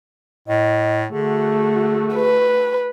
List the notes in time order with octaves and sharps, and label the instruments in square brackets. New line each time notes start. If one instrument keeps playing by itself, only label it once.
[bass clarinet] A2 [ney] D#5
[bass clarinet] D3 [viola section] A3 F#4 [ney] G#4
[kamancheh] B4